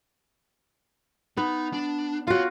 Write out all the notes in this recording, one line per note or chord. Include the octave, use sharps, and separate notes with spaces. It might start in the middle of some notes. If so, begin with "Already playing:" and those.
B3 D#4
D4
F4 F#4 C#5 F5